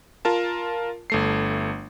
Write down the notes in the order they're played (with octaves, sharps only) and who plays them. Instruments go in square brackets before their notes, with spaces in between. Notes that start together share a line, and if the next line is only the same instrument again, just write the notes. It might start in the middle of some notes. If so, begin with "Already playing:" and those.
[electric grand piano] F4 A#4 A5
G1 A3 C7